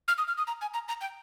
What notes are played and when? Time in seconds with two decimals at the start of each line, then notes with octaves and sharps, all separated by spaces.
0.08 F6
0.18 D#6
0.28 F6
0.38 D#6
0.47 A#5
0.61 G#5
0.74 A#5
0.88 A#5
1.01 G5